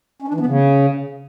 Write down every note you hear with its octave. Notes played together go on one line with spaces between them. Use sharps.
C#4
D4
E3
B3
C#3